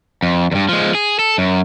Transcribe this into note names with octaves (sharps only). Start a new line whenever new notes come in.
F2
E2 G2
F3 G#3
G#4
A4
F#2